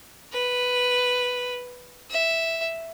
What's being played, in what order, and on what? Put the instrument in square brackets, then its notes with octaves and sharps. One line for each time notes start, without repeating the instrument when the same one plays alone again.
[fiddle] B4
E5